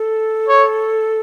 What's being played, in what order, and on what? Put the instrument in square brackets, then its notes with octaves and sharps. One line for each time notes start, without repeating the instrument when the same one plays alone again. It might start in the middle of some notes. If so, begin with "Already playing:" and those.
Already playing: [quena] A4
[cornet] C#5